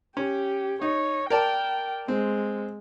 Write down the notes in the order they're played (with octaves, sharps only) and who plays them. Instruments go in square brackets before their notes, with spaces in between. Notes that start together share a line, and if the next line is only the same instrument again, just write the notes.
[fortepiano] C#4 [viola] G4
[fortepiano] D#4 [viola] C#5
[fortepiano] A#4 D5 A5 [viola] G5
[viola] G#3 [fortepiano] C4